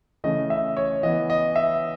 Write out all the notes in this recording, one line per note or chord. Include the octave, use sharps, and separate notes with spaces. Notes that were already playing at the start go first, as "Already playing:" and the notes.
C#3 E3 A3 D#5
E5
C#5
E3 B3 D#5
D#5
E5